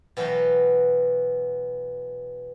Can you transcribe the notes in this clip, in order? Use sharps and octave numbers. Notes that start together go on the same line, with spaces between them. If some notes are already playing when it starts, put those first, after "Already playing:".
B2 E3 F#3 A#4 G5 B5